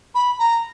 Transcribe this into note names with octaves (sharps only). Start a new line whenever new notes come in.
B5
A#5